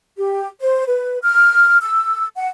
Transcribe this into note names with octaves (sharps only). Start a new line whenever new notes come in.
G4
C5
B4
F6
E6
F#5